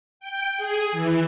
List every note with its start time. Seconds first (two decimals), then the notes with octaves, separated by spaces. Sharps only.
0.20 G5
0.57 G#4
0.92 E3